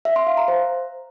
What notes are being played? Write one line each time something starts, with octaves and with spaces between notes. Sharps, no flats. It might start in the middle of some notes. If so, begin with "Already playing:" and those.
E5
C6
F5
A#5
C5